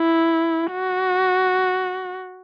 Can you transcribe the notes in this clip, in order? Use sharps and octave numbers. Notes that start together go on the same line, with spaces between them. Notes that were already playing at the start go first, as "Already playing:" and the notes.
Already playing: E4
F#4